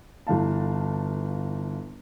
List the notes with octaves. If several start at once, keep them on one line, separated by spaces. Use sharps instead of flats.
G1 E3 F5 A5